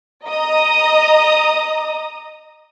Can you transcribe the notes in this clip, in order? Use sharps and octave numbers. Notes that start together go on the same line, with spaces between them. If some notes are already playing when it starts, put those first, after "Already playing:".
D#5 A#5 D#6